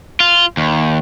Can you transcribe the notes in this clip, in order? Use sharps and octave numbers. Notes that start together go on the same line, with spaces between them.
F4
D#2